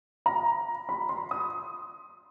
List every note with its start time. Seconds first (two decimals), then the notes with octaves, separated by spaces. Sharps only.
0.26 A#5
0.89 B5
1.09 C6
1.31 D#6